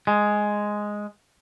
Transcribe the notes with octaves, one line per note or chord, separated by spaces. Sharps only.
G#3